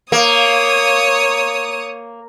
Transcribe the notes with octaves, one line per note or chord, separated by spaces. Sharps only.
A#3 C#5 D#6